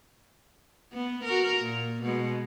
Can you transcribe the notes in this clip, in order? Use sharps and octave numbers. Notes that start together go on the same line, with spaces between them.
B3
F#4 A#4
A#2
B2 G#3